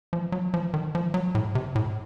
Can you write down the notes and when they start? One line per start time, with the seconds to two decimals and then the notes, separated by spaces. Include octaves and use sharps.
0.13 F3
0.32 F#3
0.54 F3
0.74 D#3
0.95 F3
1.14 F#3
1.35 A2
1.55 C3
1.75 A2